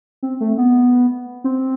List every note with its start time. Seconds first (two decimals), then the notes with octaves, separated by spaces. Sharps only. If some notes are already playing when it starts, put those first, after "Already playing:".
0.23 C4
0.41 A3
0.58 B3
1.44 C4